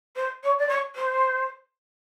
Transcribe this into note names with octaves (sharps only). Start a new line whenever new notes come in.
C5
C#5
D5
C#5
C5